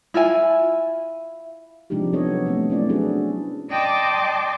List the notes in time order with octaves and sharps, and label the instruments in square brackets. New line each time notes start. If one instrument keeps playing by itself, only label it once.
[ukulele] E4 F4 E5 G#5
[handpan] C3 F3 G#3 D4 D#4 G4
F#3 B3 A4 C#5 D#5
A3 C4
F#3 A3 C#4 E4 D5
C#4 D4 F#4 G#4 A4 B4
[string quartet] D5 D#5 G5 A5 C6 D6